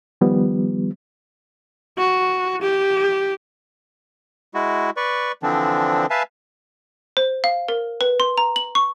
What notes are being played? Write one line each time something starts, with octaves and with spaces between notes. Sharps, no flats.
D#3 F3 G3 B3
F#4
G4
G#3 E4 F#4
B4 D5 C#6
D3 E3 F3 C4 D4
B4 E5 F5 G#5 A5
C5
F5
A#4
B4
C6
A#5
F#7
C#6